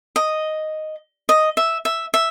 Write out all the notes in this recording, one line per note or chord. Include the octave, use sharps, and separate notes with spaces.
D#5
D#5
E5
E5
E5